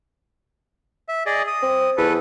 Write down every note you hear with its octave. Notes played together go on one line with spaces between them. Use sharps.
E5
G#4 D5 D#5
D#6
C4
E2 A4 B4